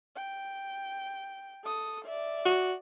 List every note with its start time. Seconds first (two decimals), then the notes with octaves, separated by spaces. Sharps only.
0.16 G5
1.64 A4 D#6
2.05 D5 E5
2.45 F#4